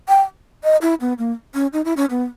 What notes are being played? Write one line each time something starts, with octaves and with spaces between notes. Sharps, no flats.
G5
D#5
E4
B3
A#3
C#4
D#4
E4
C#4
B3